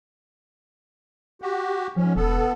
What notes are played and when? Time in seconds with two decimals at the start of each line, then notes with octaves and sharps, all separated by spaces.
1.42 F#4 G4
1.96 G#2 F3 C#4
2.16 E1 B3 A4